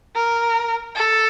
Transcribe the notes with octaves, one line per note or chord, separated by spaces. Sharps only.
A#4
A4